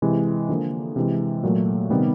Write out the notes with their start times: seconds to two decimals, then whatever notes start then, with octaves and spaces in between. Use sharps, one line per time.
0.02 C3 E3 G#3
0.49 D3 F3 A#3
0.96 C3 E3 G#3
1.43 A#2 F#3 A3
1.90 C3 D#3 G3 B3